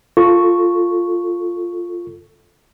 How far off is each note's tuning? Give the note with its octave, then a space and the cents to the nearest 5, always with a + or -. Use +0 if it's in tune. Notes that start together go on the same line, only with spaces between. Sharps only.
F4 +0 A4 +0 C#6 +0